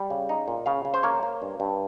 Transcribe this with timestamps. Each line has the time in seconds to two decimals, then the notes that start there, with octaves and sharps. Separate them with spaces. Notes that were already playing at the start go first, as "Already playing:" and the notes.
Already playing: G3
0.10 C#3
0.29 D#4
0.48 A#2
0.66 C#3 F5
0.85 C#3
0.94 C5
1.03 A#3 C#5
1.23 A#3
1.42 G2
1.60 G2